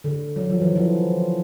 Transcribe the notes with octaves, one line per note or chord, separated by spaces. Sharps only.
D3
F#3
F3
E3
F3